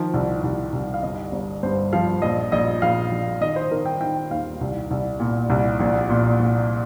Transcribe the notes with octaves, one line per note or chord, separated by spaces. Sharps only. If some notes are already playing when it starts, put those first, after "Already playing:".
Already playing: D#3 F3
C2
C2
C2
F5
G1 D#5
G1
G2 C5
F3 F5
A#1 D#5
A#1 D#5
A#1 F5
A#1
D#3 D#5
C5
D#3 A#4
G5
D#3 G5
D#2 F5
C2
C2
A#2
C2
A#1
A#2
A#1